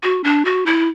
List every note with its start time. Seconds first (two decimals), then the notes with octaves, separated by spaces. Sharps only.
0.03 F#4
0.24 D4
0.45 F#4
0.66 E4